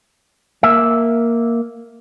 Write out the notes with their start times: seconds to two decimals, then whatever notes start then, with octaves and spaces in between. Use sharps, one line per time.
0.63 A#3 E5